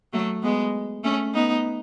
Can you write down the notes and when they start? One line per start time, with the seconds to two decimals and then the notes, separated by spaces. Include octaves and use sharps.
0.13 F#3 A3
0.42 G#3 B3
1.04 A3 C#4
1.34 B3 D#4